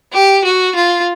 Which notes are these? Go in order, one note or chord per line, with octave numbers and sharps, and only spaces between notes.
G4
F#4
F4